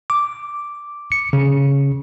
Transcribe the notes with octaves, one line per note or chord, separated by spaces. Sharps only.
D6
C#7
C#3